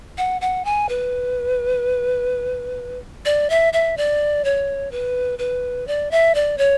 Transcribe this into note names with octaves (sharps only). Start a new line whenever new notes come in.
F#5
F#5
G#5
B4
D5
E5
E5
D5
C#5
B4
B4
D5
E5
D5
C#5